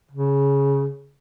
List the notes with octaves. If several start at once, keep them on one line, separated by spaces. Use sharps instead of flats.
C#3